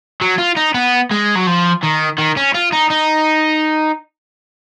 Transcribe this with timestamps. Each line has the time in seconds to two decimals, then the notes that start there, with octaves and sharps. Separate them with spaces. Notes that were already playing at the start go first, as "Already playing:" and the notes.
0.21 F#3
0.38 F4
0.57 D#4
0.74 B3
1.11 G#3
1.35 F#3
1.47 F3
1.83 D#3
2.18 D#3
2.37 C#4
2.55 F4
2.73 D#4
2.91 D#4